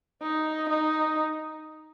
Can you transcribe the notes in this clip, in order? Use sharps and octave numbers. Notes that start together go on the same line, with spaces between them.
D#4
D#4